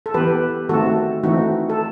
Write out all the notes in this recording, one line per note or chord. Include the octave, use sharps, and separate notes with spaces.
A4
E3 B3 G4 B4
D#3 A3 C4 F#4 A4
E3 A3 C4 D#4 F#4
A4